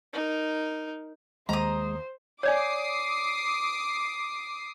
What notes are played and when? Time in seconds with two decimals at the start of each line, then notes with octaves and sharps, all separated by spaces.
0.13 D#4 A#4
1.49 D#2 G#3 C5 A#5 D#6
2.43 C#5 D5 G#5 D6 D#6 C7